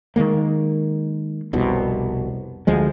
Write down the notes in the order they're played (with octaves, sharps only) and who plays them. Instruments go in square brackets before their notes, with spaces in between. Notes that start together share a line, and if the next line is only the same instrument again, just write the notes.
[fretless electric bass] D#3 F3 G#3 A#3
F1 C2 B2
D2 F3 G#3